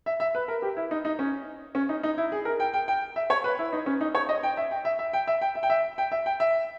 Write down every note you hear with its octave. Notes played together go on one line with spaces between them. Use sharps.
E5
E5
B4
A#4
G4
E4
D#4
D#4
C#4
C#4
D#4
D#4
E4
G#4
A#4
G5
G5
G5
E5
C#5
B4
E4
D#4
C#4
D#4
C#5
D#5
G5
E5
G5
E5
E5
G5
E5
G5
E5
G5
E5
G5
E5
G5
E5